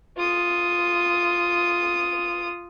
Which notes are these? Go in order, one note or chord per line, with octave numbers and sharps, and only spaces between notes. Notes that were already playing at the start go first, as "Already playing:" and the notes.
F4 D#6